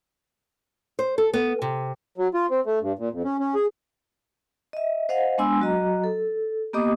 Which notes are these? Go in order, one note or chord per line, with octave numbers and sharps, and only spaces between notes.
C5
A4
B3
C3
F#3
F4
C4
A3
G2
A#2
F2
C#4
C#4
G#4
D#5 E5
C5 D#5 F5 F#5
G#3 B3 D4 G#5 C6 E6
F#3 F#4 D#5 A#5
A4
A#3 B3 G4 D#5 D6 D#6